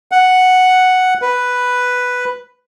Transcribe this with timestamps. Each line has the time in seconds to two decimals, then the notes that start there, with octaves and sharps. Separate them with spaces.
0.12 F#5
1.22 B4